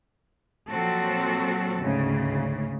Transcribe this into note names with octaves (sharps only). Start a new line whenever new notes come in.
A#2 F3 F#3 C4 F#4 A4
D2 G#2 C#3